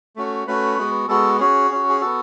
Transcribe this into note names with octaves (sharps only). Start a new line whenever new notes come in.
A3 C#4 F#4
A3 C#4 F#4 B4
G#3 B3 F#4
G#3 B3 F#4 A4
C#4 F#4 G#4
C#4 F#4
G#4
B3 F#4 A4